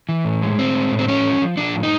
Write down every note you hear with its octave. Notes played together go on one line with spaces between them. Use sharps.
E3
A2
G#3
A2 C4
G#3
A2
C4
F3 C#4
F3
F3
F3 D4
A2
D#4